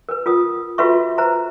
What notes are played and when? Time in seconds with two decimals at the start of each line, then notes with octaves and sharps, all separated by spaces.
0.09 A#4 B4
0.26 F4 A#4 D#6
0.78 F4 F#4 A4 B4 E5 C#6
1.18 B4 C5 E5 A#5